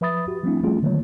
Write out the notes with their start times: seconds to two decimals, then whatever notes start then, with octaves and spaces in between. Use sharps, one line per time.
0.01 F3 B4 E5 B5 D#6 A6
0.28 F#4 G4
0.43 F3 G3 A3 C4 D4 E4
0.63 F3 G3 A3 C#4 F4 G#4
0.82 D3 D#3 F#3 A3 A#3 C#5